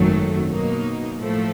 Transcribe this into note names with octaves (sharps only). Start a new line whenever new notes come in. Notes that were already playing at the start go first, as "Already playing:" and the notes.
Already playing: G#1 F#2 D#3 F#3 A3
B2 F#3 A#3 D#4
A2 F3 A3